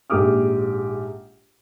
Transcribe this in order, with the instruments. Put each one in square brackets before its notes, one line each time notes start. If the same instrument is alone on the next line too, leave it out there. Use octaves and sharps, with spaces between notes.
[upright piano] A#1 G#2 G4 D6 D#6 F6